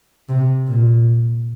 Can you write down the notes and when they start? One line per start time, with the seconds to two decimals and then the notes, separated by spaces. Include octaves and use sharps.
0.29 C3
0.67 A#2